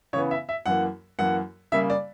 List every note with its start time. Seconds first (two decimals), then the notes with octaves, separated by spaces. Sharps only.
0.13 C#3 E3 B3 C#5
0.31 E5
0.49 E5
0.66 F#2 E3 A#3 F#5
1.19 F#2 E3 A#3 F#5
1.72 C#3 G3 A#3 E5
1.90 D5